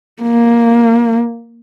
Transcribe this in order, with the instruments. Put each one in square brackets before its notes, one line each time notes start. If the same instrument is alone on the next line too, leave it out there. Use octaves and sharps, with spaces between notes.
[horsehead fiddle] A#3